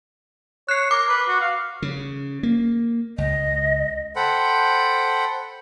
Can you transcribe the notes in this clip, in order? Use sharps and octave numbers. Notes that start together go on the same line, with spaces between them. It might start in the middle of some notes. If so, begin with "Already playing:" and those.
C#5 F#6 C7
A#4 D6
B4
F#4
F5
C#3
A#3
C#2 D#5
A4 C5 F#5 G5 B5